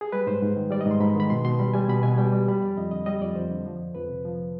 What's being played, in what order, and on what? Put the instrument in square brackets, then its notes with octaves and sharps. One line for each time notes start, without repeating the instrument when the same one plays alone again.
[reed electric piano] G#4
G3 B4
G#2 C5
G#2
D#3
G3 D5
D#5
G#2
C6
G#2 B5
D#3 B5
B2 C6
B2 C6
G3 B5
G3 G#5
B2 B5
B2 G#5
G3 G5
G3
G3 B5
F2 D5
F2 D#5
D3 D#5
G3 D#5
F2 D5
F2 C5
D3
F3
F2
F2 B4
C3
F3